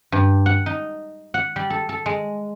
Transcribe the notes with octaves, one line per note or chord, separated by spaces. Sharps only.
G2
F#5
D#4
F#5
G3
A4
A4
G#3